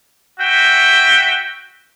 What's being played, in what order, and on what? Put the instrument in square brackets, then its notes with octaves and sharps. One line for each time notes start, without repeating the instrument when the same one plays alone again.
[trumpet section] F#4 E5 G5